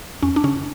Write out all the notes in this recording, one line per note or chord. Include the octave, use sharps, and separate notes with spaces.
F2 C#4
D4
C#3 C#4